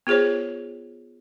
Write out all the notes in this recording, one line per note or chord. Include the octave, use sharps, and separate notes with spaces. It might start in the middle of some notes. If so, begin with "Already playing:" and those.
B3 F4 G#4 C5 C#5